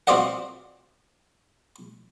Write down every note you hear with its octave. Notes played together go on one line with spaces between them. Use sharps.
C4 F4 F#4 D5 D#5 F#5